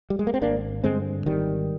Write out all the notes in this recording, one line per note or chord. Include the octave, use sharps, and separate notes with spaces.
G3
G#3
A#3
C4
G#1 A#3 D4
G2 D3 G#3 C4
G#1 D#3 G3